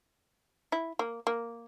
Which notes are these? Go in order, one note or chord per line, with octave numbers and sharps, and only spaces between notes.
E4
A#3
A#3